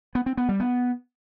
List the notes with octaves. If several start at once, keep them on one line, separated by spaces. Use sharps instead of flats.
B3
C4
B3
G3
B3